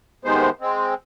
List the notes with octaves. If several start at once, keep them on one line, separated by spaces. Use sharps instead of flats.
G#2 C3 D#3 G#3 B3 C5
G#3 C4